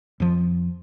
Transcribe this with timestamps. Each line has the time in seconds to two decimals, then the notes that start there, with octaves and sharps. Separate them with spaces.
0.20 F2 F3